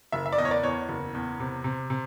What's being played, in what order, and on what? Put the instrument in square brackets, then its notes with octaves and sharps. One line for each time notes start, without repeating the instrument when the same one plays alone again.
[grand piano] F#1 E5
E5
D5
E2 D#5
C#5
D5
E2 C#5
F#1
E2
C3
C3
C3